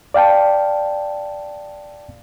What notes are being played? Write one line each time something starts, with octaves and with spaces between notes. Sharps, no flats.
D5 F5 G5 A5